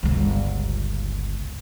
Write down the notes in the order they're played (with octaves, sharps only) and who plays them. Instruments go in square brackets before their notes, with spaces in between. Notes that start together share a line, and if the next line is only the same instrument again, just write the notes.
[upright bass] G1 C#2